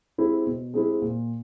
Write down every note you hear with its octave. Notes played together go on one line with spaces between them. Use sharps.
G#3 C4 E4 G4
B2
G#3 C4 E4 G4
A#2